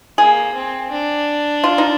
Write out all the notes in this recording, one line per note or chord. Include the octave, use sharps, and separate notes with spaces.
A#3 G#4
C4
D4
F4
D#4